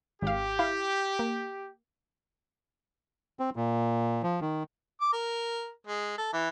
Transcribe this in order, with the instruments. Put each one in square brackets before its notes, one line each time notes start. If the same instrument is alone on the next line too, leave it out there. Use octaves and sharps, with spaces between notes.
[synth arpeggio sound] G#1 F5 [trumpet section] G4
[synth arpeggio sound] E4 F5
A#3
[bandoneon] C4
A#2
F3
D#3
[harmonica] D6
A#4
G#3
A4
E3